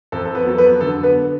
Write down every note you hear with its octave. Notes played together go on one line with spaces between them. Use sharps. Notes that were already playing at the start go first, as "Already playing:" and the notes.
F2 A4
A4
B3 B4
F#3 A4
B3 B4
D3 A4
B3 B4